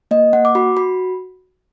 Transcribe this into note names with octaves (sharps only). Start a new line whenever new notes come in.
A#3 D#5
A#3 F#5
D6
F#4 B5
F#4 B5